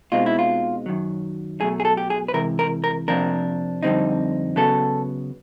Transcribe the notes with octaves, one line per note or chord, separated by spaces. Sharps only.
B2 G#3 C4 D#4 F4
E4
F4
F#2 D#3 F#3
B2 F#3 A3 G#4
G#4
A4
G4
G#4
B4
C3 E3 G#3 A#4
A#4
A#4
F2 C3 F3 A#3 D4 A#4
F2 D3 G3 C4 D#4
C#3 F#3 B3 A4